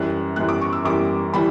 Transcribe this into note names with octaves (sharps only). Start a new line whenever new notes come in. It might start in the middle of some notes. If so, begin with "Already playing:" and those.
Already playing: F#2 E3 G3 F#6
F#2 E3 G3 F#6
D6
C#6
E6
F#2 E3 G3 D6
E3 G3 B5